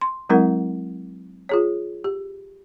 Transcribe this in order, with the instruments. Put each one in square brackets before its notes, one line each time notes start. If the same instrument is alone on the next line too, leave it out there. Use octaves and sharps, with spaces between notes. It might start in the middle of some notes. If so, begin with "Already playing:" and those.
[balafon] C6
F#3 G#3 C4 E4 A#4 F#5
F4 G#4 C#5
G4